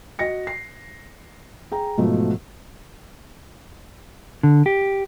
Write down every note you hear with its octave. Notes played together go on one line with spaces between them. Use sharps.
F#4 D#5 A#6 C#7
C7
G#4 G5 A#5
G#2 B2 F3 F#3 A3
D3
G4